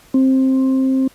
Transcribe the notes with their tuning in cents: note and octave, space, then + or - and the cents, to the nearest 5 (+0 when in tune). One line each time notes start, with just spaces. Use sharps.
C4 +15